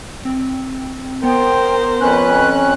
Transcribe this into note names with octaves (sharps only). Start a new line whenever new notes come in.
C4
B3 A#4 C5 G5
F2 C#4 B4 F#6